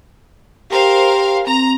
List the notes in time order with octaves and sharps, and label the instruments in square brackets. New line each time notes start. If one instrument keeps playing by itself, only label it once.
[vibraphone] G4 G5 C6 [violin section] A#4 C5 F5
[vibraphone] C4 [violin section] A#5